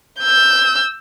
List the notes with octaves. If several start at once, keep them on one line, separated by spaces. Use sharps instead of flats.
E6 G6